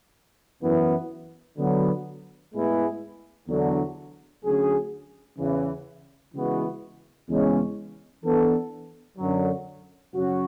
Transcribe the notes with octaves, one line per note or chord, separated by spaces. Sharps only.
F#2 E3 B3
D3 F#3 B3
A2 G#3 B3 E4 G#4
E2 D3 F#3
D2 D3 F#3 C#4 G#4
E2 C#3 E3
C#3 E3 G#3 B3 F#4
E2 C#3 G#3 C#4
E3 B3 D4 A4
F#2 D3 F#3
F#2 C#3 F#3 C#4 F#4